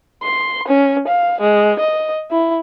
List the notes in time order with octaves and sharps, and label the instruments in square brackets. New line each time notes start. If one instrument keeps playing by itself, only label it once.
[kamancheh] C6
C#4
F5
G#3
D#5
E4